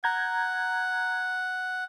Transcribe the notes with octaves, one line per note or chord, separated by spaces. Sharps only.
F#5 A#5 G6 G#6